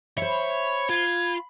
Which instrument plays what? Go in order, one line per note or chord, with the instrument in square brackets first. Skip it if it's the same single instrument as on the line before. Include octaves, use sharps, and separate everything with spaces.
[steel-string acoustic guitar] C5 E5 [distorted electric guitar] C#5 [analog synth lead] B5
[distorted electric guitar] F4 [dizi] G#6